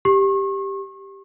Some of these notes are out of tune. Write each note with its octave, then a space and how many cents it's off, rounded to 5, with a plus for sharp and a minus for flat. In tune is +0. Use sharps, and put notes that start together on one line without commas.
G4 +0 C#6 -35